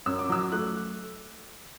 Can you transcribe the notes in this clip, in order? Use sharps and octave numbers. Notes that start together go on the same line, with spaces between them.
F#2 E6
D6
F#3 E6
A3 F#6